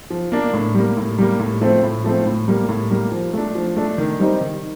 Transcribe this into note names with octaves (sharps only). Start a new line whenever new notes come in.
F3
A#3 D4
A2
G3 A#3
A2
G3 A#3
A2
F3 A3 C4
A2
F3 A3 C4
A2
G3 A#3
A2
G3 A#3
F3
A3 D4
F3
A3 D4
D#3
G3 C4 D#4
D#3